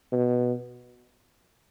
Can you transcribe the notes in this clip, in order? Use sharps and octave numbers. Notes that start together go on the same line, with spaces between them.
B2